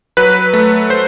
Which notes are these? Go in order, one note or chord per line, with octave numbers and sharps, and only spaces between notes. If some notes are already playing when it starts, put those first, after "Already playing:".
F#3 B4
A3
C5